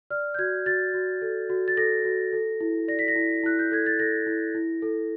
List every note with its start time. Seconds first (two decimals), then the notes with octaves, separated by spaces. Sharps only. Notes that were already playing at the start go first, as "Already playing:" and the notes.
0.10 D5 F6
0.34 G6
0.39 F#4 G#6
0.66 F#4 A6
0.94 F#4
1.22 A4
1.50 F#4
1.68 A6
1.77 A4 A#6
2.05 F#4
2.33 A4
2.61 E4
2.88 D5 A#6
2.99 B6
3.08 A#6
3.16 E4
3.43 E4 F#6
3.59 G6
3.71 A4 G#6
3.86 A6
3.99 A4 A#6
4.26 E4
4.55 E4
4.82 A4